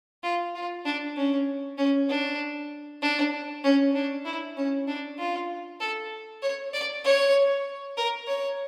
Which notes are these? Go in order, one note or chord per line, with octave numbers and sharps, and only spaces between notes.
F4
F4
D4
C#4
C#4
D4
D4
C#4
D4
E4
C#4
D4
F4
A4
C#5
D5
C#5
A#4
C#5